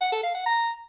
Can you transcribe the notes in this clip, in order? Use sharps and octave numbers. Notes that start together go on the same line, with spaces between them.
F#5
A4
F5
F#5
A#5